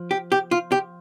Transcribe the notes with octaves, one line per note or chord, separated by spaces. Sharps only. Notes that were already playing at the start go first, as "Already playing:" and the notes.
Already playing: F3
G4
G4
F4
G4